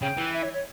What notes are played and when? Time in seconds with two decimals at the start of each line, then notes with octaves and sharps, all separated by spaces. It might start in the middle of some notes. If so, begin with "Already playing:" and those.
0.02 C#3 G5
0.18 E3
0.33 E5
0.43 C#5
0.53 C#5